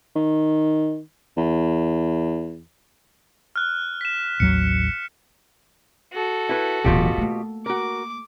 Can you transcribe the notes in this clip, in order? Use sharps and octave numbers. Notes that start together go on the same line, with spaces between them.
D#3
E2
F6 F#6
B6 E7
A1 D#2 F#3 C#7
F#4 A4
E4 B4
D1 B2 E3 F4 G4
A3 A#3
F#4 A#4 D6